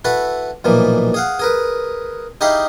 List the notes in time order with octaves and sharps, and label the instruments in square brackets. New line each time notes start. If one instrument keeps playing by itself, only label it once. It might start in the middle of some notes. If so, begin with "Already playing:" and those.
[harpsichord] E4 F#4 A4 B4
B1 A#2 E3 F3 A#3
G#4 F5 F#5
G#4 A#4 B4
D#4 E4 G4 G#4 E5 F5